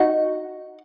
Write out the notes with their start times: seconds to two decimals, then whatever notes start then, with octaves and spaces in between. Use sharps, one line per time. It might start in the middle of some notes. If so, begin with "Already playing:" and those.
Already playing: D#4 F#4